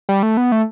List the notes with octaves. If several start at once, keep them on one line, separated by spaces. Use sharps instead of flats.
G3
A3
B3
A3